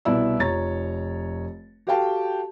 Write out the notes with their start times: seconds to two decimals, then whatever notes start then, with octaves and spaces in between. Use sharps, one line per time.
0.05 C2 B2 B3 E4 D5 E6
0.39 F1 F3 C#5 A#5 A6
1.87 F#4 G4 A4 F5 G5 A5